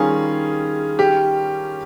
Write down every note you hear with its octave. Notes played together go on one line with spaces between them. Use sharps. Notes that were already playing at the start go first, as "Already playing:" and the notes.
Already playing: D#3 G3 C#4 F4 G#4 A#4
G4